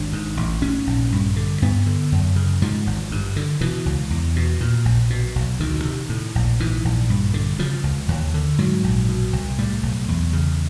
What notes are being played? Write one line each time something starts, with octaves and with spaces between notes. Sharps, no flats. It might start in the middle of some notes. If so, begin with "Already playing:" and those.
Already playing: G#1 D4
G#2
A1
G#2 C#4
A#1
G2
D3
G2 B3
D3
F#2
C#3
G#2 F3
G#1
G2
D3
B2 E3
C#2
E2
B2
A#2
A#1
B2
B1
D2 D#3
C3
A2
A#1
G#2 E3
A#1
G2
D3
C#3 F3
C#2
D#2
D3
G#2 F#3
A#1
B2
C2
A2 G3
B1
E2
C#3